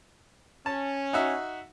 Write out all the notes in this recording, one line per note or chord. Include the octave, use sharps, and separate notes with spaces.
C#4 A5
D#4 F#4 E5